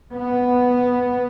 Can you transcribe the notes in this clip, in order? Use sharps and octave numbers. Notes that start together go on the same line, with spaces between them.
B3